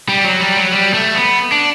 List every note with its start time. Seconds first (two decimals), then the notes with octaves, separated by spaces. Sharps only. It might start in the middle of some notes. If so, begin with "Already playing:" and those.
0.08 G3
0.24 F#3
0.41 G3
0.56 F#3
0.72 G3
0.94 A3
1.15 B3
1.52 D4